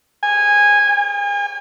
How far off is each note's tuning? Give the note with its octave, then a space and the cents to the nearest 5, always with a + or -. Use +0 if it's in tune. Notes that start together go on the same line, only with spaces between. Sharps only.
G#5 -15
G#5 -40